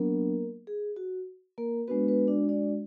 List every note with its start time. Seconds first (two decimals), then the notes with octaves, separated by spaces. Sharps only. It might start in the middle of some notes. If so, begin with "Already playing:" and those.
Already playing: F#3 A#3 B3 D4 A#4
0.67 G#4
0.96 F#4
1.58 A#3 A#4
1.88 G#3 B3 D4 F#4 B4
2.08 B3 B4
2.28 D4 D5
2.49 D4 D5